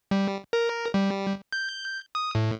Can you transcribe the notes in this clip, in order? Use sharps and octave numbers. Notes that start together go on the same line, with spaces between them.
G3
A#4
G3
G6
D#6
A2